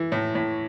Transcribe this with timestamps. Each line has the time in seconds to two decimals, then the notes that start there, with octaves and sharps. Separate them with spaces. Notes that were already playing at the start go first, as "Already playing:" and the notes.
Already playing: E3
0.12 A2
0.35 A2